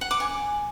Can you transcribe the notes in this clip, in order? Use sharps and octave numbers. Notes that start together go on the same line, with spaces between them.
F#5
D6
G#5